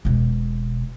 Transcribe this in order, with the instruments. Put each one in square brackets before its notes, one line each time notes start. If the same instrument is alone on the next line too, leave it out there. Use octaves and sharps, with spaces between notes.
[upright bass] E1 B2